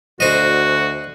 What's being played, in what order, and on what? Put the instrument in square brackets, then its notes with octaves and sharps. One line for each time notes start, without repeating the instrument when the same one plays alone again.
[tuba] D2 [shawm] F#4 [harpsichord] C5 D#5